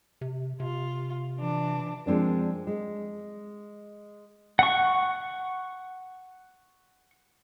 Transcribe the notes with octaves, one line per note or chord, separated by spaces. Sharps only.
C3
C3 F4
E3 D4
F3 G#3 C4 D4 A#4
G#3
F#5 C#6